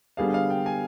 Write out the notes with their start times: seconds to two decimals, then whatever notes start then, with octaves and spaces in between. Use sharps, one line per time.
0.17 D3 G3 B3 D4 G#4 F5
0.34 F5
0.50 G5
0.66 G#5